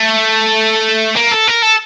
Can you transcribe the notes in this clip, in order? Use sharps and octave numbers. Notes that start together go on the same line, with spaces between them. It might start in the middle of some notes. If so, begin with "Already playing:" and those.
Already playing: A3
A#3
A4
A#4
A4